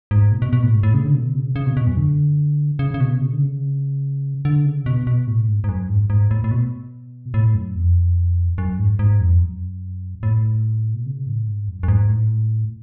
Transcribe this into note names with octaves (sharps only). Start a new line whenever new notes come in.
G#2
B2
B2
B2
A2
G#2
A2
C#3
D3
B2
C#3
C#3
B2
B2
F#2
D3
C#3
C#3
B2
C#3
D3
C#3
D3
C#3
B2
B2
A2
G#2
G#2
F#2
G#2
G#2
A2
A2
B2
A2
F#2
F2
F#2
G#2
G#2
F2
F#2
A2
B2
C#3
A2
G#2
F#2
F#2
G#2
A2